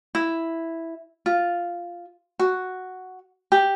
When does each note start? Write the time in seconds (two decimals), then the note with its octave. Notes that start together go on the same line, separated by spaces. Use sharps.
0.15 E4
1.26 F4
2.39 F#4
3.52 G4